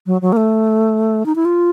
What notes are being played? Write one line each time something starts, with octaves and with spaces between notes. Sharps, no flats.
F#3
F#3
A#3
A3
D#4
E4
F4